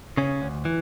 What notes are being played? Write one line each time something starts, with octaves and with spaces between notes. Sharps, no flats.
C#3 C#4
D2
E3